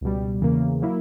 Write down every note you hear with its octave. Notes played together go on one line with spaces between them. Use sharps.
C#2 B2 G3
E2 C#3 E3 A#3
F#3 A#3 E4